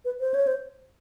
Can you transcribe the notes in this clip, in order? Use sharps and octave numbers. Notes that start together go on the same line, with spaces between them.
B4
C5
C#5
C5